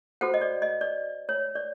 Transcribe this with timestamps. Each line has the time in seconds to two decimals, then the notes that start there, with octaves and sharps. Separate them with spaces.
0.21 F#4 A4 C5 F#5
0.34 D#5
0.41 D5
0.62 D#5
0.81 D5
1.29 C#5
1.55 D5